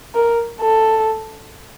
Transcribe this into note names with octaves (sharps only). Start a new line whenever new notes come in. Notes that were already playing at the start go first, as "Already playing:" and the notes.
A#4
A4